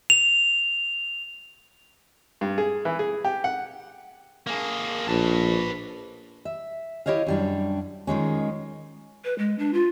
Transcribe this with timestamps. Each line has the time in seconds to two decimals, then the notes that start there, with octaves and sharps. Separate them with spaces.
0.10 F7
2.41 G2
2.58 G#4
2.85 E3
2.99 G#4
3.25 G4
3.44 F#5
4.47 A#3 G#4
5.08 A#1 B4 A5
6.45 E5
7.06 E4 G4 C#5 D#5 F5
7.26 F#2 G3 D4
8.07 D#3 F3 G#3 C#4
9.24 B4
9.38 G#3
9.58 D4
9.74 F4